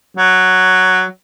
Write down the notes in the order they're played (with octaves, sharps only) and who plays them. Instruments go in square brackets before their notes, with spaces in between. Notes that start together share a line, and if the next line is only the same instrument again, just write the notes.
[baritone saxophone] F#3